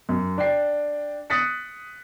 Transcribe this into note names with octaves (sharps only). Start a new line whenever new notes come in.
F#2
D4 G5 C7
D#6 F#6 A6 B6 C#7